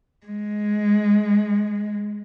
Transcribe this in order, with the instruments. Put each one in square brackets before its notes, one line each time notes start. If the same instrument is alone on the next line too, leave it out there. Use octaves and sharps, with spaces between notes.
[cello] G#3